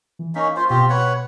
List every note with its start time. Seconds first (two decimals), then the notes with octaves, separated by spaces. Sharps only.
0.19 E3
0.35 A#3 C#4 D#4 C#6 B6
0.56 F4 C5
0.70 B2 C4 F4 G4
0.90 B4 C#5 F#5